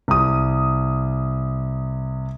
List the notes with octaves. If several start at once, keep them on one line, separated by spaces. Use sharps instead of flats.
C2 D#6